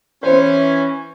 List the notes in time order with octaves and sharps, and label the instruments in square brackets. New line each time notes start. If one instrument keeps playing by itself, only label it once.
[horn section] E3 C#4 [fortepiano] C5